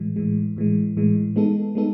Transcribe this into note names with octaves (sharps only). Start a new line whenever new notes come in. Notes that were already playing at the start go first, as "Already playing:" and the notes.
Already playing: A2 E3 G#3
A2 E3 G#3
A2 E3 G#3
A2 E3 G#3
G#3 B3 D#4 A4
G#3 B3 D#4 A4